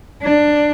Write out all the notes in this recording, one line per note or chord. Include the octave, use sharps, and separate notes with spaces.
D4